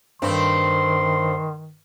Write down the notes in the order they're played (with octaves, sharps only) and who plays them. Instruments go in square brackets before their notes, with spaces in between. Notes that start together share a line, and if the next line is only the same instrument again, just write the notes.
[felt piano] G2 [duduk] D#3 [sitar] A3 C4 [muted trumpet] C6